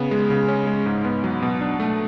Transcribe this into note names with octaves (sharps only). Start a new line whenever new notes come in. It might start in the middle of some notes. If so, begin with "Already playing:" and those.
Already playing: C#3 B3
G#3
C#3
C#4
G#3
G#2
B3
F#3
B2
D4
A3